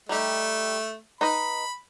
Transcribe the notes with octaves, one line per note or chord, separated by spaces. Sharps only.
G3 A3 D#4 G4
D#4 B4 D#5 B5